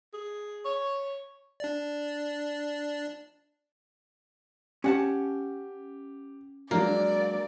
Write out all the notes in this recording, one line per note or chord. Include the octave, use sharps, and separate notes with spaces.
G#4
C#5
D4 D5
C#4 G4 F#5 A5
F#3 G#3 A#3 D4 D5